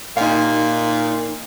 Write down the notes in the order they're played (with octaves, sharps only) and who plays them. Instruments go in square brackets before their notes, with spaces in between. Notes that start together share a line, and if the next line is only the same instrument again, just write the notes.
[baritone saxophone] A#2 [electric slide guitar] D#4 F5